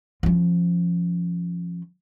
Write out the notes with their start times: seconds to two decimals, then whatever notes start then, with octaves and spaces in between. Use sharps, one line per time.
0.23 F3 C#4